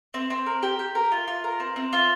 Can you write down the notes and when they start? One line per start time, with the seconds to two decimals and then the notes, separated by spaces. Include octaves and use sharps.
0.14 C4
0.30 C4
0.46 A#4
0.63 G4
0.79 G4
0.95 A#4
1.12 F4
1.28 F4
1.44 A#4
1.60 C4
1.76 C4
1.93 F4